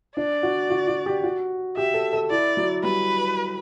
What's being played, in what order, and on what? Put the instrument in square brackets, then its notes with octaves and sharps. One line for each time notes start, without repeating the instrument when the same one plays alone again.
[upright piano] D4 [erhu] D5
[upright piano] F#4
F#4
F#4
G4
F#4
[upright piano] G4 [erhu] E5
[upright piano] A4
A4
[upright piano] E4 [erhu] D5
[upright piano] F#3
[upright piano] G3 [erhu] B4